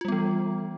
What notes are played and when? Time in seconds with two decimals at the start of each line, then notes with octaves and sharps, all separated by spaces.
0.01 F4
0.05 G3
0.08 B3
0.12 E3